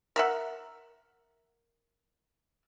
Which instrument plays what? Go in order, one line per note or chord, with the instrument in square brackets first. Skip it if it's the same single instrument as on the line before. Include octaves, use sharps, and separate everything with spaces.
[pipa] A#4 E5 F#5